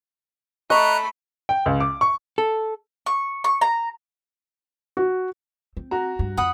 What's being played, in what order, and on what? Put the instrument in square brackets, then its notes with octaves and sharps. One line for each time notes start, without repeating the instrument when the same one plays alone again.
[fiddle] A3 B5 [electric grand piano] D#5 [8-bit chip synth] A#5 F#6 [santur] C#6
[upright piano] G5
C#2
D6
C#6
[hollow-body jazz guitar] A4
[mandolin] C#6
C#6
A#5
[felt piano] F#4
[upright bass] C4
[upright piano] F#4 A#5
[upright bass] G2
[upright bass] F2 [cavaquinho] F#5 B5 D#6